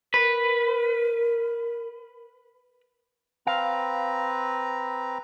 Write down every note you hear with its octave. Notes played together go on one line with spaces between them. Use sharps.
A#4 B4
C4 B4 F5 A#5